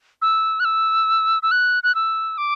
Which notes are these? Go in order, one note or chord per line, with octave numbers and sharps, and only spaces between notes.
E6
F#6
E6
E6
F#6
F#6
E6
D6